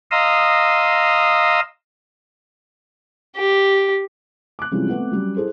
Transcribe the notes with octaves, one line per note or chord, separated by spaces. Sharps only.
D#5 F5 A#5 C6 D#6 E6
G4
D6 F#6
C3 E3 F3 G3 G#3 C#4
A3 B3 C4 F#5
F#3 G3 C#4
E4 G#4 A4 C5